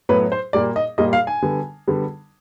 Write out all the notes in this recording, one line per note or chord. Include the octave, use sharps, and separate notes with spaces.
A2 F#3 B3 B4
C5
A#2 G3 A#3 D5
D#5
A#2 G3 A#3 D#5
F5
G#5
D3 G3 B3
D3 G3 B3